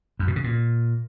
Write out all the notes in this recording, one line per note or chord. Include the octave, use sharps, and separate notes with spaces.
F#2
B2
C#3
A#2